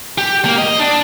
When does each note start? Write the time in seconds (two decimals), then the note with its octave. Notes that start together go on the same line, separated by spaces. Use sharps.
0.18 G4
0.45 A#3
0.58 D#5
0.79 D4